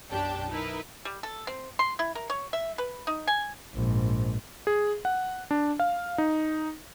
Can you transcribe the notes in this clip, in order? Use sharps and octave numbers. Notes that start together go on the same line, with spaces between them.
B1 F#2 D4 G4 G5 A5
D#4 E4 A#4 B4
G3
A4
C4
C6
E4
A#4
C#5
E5
B4
D#4
G#5
A#1 G#2
G#4
F#5
D4
F5
D#4